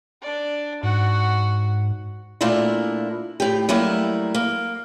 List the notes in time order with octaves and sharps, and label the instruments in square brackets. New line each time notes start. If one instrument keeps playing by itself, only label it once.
[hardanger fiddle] D4 D5
[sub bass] G#2 [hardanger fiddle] F#4 F#5
[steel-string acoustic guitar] A#2 A3 A#3 D4 E4
A2 G4
F#3 G3 A3 A#3 E4
A#3